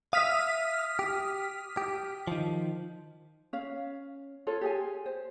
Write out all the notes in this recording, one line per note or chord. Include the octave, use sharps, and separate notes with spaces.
E5 F5 D#6 F6 B6
G4
G4
D#3 F3
C#4 F5
F4 A4 C#5
G4 G#4 G#5
C5